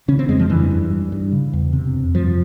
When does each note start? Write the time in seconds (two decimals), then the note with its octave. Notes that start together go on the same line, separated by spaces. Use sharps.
0.08 C#3 C#4
0.19 C4
0.29 F2 G#3
0.39 F3
0.50 G2 E3
0.71 G2
0.90 G2
1.12 G2
1.32 C#3
1.53 E2
1.73 C3
1.94 F2
2.14 G2 F3